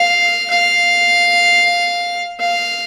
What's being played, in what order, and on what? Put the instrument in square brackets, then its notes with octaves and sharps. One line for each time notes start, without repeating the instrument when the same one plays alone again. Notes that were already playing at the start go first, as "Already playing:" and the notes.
Already playing: [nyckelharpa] F5
F5
F5